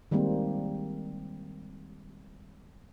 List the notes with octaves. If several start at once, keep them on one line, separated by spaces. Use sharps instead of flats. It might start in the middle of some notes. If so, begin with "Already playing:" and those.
D#3 G3 G#3 A#3 C4